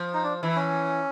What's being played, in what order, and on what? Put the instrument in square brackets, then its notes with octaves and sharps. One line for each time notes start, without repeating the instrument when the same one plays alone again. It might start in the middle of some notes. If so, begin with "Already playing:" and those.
Already playing: [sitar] F3
[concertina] D#4
D4
[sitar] E3 [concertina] E4
[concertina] C#4